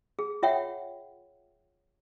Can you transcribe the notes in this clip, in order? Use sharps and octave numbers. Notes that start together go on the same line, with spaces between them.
G#4
F4 C#5 E5 F#5 G5